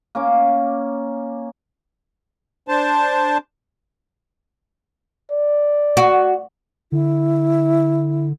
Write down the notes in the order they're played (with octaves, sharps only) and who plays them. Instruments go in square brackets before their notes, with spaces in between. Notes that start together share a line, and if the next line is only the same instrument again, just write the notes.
[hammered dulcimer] A#3 C#4 D6
[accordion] D4 C5 A5
[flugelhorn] D5
[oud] F#4
[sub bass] D3 [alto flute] E4